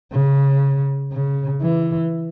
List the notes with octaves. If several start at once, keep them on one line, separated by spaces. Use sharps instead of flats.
C#3
C#3
E3